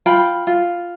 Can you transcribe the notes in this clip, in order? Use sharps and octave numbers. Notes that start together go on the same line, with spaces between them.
F4 G5 B5
F4